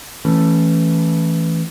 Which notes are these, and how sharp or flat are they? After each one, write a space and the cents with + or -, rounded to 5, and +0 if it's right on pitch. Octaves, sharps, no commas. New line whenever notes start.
E3 +0 A3 +0 C#4 -15